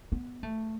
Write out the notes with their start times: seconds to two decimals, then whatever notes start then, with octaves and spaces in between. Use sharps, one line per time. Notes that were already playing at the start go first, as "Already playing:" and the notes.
0.12 B3
0.43 A3